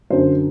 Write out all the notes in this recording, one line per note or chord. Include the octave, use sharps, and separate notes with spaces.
F#2 D3 C5